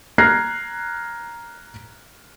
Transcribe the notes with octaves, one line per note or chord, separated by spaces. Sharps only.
A#5 F6 F#6 G#6 A#6 C7